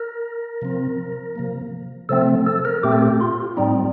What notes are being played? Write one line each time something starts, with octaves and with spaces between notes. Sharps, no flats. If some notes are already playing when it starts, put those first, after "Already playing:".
Already playing: A#4
C3 F3 C4
C3 F3 A#3
C3 F3 A3 C4 A4
A4
A#4
A#2 A3 C4 G4
A4
G4
F4
A2 G3 C4 D#4